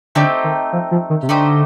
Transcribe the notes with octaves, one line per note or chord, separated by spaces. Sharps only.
D3 A3 C4 D#4 G4
D#3
F3
F3
D#3
C3
D3 A3 D#4 G4 C5